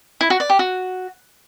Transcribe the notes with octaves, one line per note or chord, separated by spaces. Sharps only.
E4
F#4
D5
G4
F#4